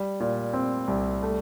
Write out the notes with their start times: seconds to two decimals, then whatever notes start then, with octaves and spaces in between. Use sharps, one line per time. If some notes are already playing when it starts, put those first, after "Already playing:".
Already playing: G3
0.20 A#2
0.54 C4
0.88 C2
1.23 A3